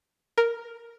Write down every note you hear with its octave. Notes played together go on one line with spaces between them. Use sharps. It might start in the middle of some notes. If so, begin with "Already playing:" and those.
A#4